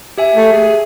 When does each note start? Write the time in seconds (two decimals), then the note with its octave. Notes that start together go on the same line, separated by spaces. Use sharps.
0.18 G4 E5 G#5
0.35 A3
0.53 G#4